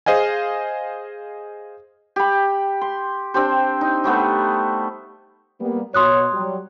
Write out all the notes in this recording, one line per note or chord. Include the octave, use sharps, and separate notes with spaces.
G#4 C5 D#5 F5 G#5
G4 B5
C6
C4 D4 G4 C5
D#4
G3 A3 B3 C5
G3 A#3 B3
B2 F#4 C#5 C6 D#6 F#6
F#3 G3